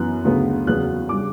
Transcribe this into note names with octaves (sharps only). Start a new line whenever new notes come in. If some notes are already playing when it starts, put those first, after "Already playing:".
Already playing: F#2 E3 B3 F#6
D2 C#3 F#3 B3
E2 C#3 F#3 B3 F#6
C#3 G3 D4 D6